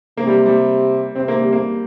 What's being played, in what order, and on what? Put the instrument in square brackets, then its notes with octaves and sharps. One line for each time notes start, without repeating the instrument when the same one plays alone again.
[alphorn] C3 [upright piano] A#3
[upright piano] G3
G3
[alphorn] C3 [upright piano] C4
[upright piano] A#3
G3
A#3